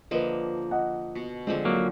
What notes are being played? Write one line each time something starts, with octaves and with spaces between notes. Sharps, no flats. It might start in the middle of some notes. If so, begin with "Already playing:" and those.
D3 F3 A#3 B4 D#5
D#5 F#5
B2
D3 F3 G#3 C4
F#3 A#3